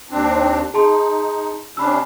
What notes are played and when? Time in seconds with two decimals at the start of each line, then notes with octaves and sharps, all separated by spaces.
0.11 D#2 C4 D4
0.74 D#4 G#4 A5 C6
1.77 C3 C#4 D4 B5 E6